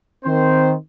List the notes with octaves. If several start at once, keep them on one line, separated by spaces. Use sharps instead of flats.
D#3 C4 C5